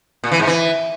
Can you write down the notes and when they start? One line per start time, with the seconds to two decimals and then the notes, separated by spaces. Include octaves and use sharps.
0.24 A#2
0.31 E3
0.39 G#2
0.47 E3